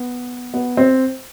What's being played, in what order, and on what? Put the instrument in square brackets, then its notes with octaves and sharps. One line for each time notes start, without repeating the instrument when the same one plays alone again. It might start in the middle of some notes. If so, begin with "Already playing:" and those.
Already playing: [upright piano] B3
B3
C4